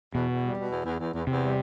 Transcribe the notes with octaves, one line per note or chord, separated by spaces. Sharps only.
E2 B2
E2
G3
B2
E2
E2
E2
E2
E2 C3
G3